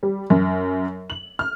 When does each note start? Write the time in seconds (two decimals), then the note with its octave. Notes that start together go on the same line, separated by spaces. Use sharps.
0.03 G3
0.30 F#2
1.10 F#7
1.39 F6